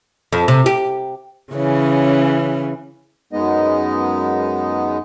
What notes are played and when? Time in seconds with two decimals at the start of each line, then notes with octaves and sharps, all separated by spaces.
0.33 F2
0.48 C3
0.66 G4
1.53 C#3 E3 C#4
3.33 F#2 G#3 B3 D#4 D#5